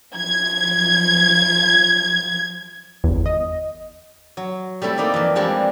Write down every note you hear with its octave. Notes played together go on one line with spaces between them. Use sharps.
F3 G#6
G1 E2
D#5
F#3
G3 A3 C4 E4 A4
A#3 D#4 D5 E5
F2 E3
E3 F3 G3 G#3 C4 D4